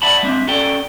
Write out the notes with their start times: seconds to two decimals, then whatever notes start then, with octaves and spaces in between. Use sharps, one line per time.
0.02 D5 E5 F#5 A5 B5
0.23 G#3 C4 D4 E5
0.47 C#4 F#4 A4 D5 G5